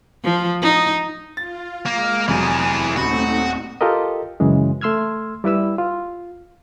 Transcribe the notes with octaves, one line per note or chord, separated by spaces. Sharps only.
F3
D#4
F4 A6
G#3 A#3
F1 E3 F#3 G#4 G5 A5
D#1 A3 C4 D#4 F#4 B5
F4 G4 A4 A#4 D#5
F#2 C#3 E3 G#3
A3 C6 E6 F6 G#6
G3 E4 B4 E6
F4